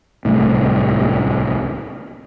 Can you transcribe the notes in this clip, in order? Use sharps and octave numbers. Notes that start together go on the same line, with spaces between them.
D1 C2 A2